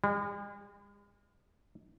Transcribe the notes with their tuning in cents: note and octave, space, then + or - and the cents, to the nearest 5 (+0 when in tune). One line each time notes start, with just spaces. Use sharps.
G#3 -45